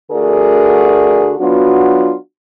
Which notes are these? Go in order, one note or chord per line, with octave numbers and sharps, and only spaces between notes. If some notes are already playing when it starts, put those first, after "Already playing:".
D3 A3 F#4 G#4 A#4 D5
F#3 B3 D4 F4 F#4